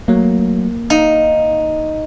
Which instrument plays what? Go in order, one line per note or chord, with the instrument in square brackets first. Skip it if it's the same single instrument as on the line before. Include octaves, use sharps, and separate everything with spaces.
[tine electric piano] F#3 A3 [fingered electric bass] A#3
[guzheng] D#4 [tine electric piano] F5